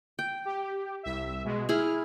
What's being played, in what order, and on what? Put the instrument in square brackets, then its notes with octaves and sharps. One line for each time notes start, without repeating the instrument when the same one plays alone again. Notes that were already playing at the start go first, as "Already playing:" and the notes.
[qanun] G5
[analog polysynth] G4
C2 E5
B2 G#3
[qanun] E4 G#4 [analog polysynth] F6